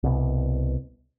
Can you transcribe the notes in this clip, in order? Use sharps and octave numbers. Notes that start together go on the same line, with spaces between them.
C2 B2